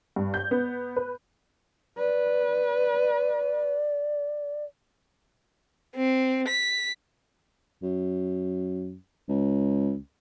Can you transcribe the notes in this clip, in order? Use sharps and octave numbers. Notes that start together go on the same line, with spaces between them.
G2
G6
B3
B4
B4 D5
C4
B6
F#2
C#2